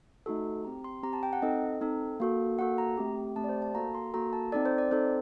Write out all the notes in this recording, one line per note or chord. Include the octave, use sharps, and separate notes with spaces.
A3 D#4 F#4 A4
C4 G4 A#5
C6
C4 G4 A#5
A5
G5
F#5
C4 D#4 A4 D#5
C4 D#4 A4
A#3 F#4 A4
A#3 F#4 A4 F#5
A#5
A3 C4 G4
A3 C4 G4 A5
D5
C5
A5
A#3 F#4 A4 A#5
C6
A#3 F#4 A4 A#5
A5
C4 D#4 A4 D5
C5
D5
C4 D#4 A4 C5